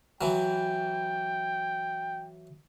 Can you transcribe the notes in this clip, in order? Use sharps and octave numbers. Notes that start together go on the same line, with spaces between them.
E3 F#3 G5